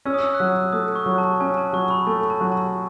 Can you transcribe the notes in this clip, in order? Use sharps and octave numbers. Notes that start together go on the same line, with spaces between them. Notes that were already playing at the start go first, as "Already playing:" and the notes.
C#4 E6
D#6
E6
F#6
F#3 E6
A3 D#6
C#6
F#3
A5
C#4 G#5
A5
F#3 C#6
B5
A3 G#5
A5
F#3
A5